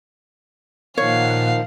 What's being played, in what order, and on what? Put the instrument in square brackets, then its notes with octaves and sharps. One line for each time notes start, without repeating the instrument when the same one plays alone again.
[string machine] A#2 F#5 [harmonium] D#3 F3 [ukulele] C#5 [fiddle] F5